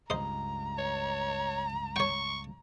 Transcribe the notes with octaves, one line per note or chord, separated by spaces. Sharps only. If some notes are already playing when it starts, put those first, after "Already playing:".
C#2 G2 C5 D#5 A#5
C#5
C#5 G5 C#6